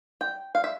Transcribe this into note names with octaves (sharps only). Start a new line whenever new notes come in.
G5
F5
E5